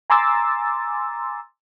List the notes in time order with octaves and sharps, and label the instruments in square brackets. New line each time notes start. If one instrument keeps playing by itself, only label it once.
[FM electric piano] G#5 A#5 C6 D6 E6 A6